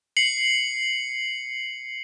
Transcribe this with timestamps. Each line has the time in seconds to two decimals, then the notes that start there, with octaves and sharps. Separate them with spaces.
0.17 C7 C#7 F#7